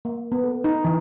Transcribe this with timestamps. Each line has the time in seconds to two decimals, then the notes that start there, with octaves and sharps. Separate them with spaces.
0.05 A#3
0.32 B3
0.44 A4
0.64 D#4
0.85 E3